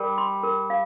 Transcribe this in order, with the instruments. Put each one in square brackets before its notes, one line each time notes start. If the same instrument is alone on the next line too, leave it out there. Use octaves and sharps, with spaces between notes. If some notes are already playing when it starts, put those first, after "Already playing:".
Already playing: [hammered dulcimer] G3 [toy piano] A#4
[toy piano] C6
A#4
F5